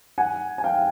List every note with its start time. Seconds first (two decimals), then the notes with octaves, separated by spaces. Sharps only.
0.18 F#5 G#5
0.58 G#5
0.64 F5 G5